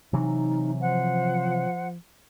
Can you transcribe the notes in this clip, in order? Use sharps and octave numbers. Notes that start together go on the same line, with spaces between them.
C3 E3 F#3 D#4
F3 C5 F#5